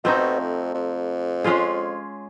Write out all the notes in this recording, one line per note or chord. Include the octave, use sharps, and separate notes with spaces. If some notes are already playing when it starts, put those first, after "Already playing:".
B2 A3 C4 D#4
F2
F2
G#3 C#4 F4 G#4